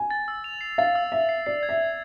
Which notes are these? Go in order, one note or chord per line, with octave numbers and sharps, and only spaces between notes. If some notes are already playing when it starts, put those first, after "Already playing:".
Already playing: G#5
A6
E6
F7
C7
F5 A6
E6
E5 F7
C7
D5 C7
G#6
E5
G#6